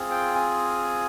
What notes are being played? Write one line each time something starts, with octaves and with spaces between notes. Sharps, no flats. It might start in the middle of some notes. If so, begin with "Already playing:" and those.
Already playing: C4 F4 G#4
G5
G#5